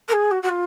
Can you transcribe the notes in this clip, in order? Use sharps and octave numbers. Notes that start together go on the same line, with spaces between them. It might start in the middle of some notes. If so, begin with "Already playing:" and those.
A#4
G#4
F#4
F#4
F4